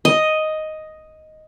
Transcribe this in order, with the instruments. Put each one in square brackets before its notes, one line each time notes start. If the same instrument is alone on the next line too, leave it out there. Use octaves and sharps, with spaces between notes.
[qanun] D#5